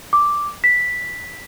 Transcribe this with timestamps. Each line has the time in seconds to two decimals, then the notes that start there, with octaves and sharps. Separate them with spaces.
0.13 D6
0.64 B6